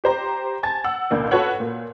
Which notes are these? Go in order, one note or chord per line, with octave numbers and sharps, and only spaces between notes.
G4 C5 A#5
G#5 A5 A6
F#5 E6
A1 D2 B2 A#3 D5
F#4 A4 B4 C#5 F#5
A#2